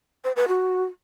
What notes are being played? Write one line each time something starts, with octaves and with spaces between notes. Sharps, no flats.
C5
B4
F#4